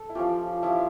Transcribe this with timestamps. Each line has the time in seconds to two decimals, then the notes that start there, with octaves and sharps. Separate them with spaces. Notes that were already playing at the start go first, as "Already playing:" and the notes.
Already playing: A4
0.09 E4
0.15 F3 C#4 F4 G4
0.63 F3 C#4 E4 G4